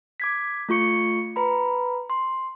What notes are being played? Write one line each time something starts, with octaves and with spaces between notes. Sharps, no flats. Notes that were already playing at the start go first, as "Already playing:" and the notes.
D6 G#6 B6
A3 F4 C#6 C#7
B4 A#5 B5
C6